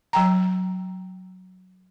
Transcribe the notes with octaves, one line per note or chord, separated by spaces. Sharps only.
F#3 G5 A#5